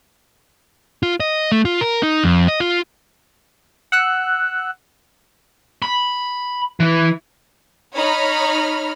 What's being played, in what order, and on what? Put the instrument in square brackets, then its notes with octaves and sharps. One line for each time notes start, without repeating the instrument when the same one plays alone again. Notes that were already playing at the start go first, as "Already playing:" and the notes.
[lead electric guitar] F4
D#5
A3
F4
A#4
D#4
F2
D#5
F4
[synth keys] F#5 E6 F#6
[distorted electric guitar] B5
E3
[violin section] D#4 C#5 B5 F6